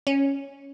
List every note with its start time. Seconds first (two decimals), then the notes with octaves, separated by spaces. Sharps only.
0.07 C#4